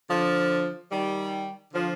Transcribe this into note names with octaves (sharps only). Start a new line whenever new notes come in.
D3 F3
D#3 G3
D3 F3